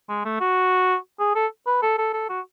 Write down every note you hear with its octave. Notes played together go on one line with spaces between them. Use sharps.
G#3
A3
F#4
G#4
A4
B4
A4
A4
A4
F#4